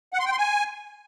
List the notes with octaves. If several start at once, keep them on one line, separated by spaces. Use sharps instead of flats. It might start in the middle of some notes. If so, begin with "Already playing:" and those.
F#5
C6
G5
C6
G#5